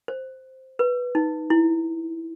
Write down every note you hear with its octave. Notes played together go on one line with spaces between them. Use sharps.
C5
B4
D#4
E4